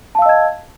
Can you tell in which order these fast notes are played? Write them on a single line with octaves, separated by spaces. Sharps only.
A5 F5 E6 D#5 G#6